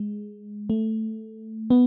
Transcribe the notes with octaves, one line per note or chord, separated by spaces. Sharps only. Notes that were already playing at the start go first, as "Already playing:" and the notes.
Already playing: G#3
A3
B3